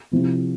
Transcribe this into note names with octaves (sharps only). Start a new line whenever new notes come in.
C3 F3 C4 E4